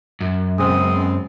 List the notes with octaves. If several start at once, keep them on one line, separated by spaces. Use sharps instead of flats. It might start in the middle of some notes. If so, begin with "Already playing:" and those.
F#2
C#3 G#3 B3 C4 D#6